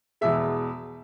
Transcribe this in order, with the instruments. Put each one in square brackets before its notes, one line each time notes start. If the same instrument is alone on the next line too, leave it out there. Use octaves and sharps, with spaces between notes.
[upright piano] E2 B2 G#3 E5